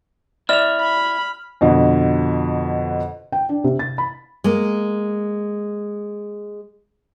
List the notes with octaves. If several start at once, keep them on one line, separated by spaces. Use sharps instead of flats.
E4 D5 E5 F6 F7
B5
F2 B2 D3
G5
D4
C3
A6
B5
G#3 A#3